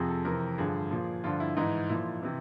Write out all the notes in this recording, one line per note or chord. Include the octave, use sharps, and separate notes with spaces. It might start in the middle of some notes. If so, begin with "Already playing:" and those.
Already playing: F2 C3 F3 G#4
A4
F2 C3 E3 A#4
G2 D3 F3 G#4
A#2 F3
G2 D3 F3 F4
E4
G#2 E3 D#4
A#2 F3 E4
C3 E3